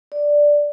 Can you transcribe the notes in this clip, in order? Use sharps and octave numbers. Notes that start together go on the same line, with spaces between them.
D5